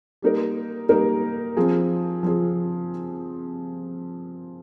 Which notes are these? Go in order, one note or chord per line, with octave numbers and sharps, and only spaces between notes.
G3 A#3 D#4 A#4
G3 A#3 D#4 A#4
F3 C4 F4 G#4
F3 C4 F4 G#4